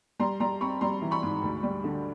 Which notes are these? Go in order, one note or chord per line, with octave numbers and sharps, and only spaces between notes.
G3 A#5 C6
G3 A#5 C6
C4 B5 C#6
G3 A#5 C6
E3
B5 C#6
G#2
D2
G3
D3